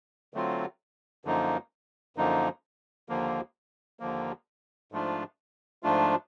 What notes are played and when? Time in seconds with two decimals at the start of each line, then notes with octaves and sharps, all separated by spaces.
0.34 D3 F#3 A3 C4 F4
1.25 F#2 D3 F3 A#3 D#4
2.16 F#2 D3 F3 A#3 D#4
3.09 D#2 D3 F3 A#3
4.00 D#2 D3 F3 A#3
4.92 G#2 F3 A3 D4 F4
5.83 G#2 F3 A3 D4 F4